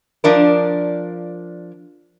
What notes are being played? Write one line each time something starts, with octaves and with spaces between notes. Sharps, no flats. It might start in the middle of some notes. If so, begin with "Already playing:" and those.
F3 D4 A#4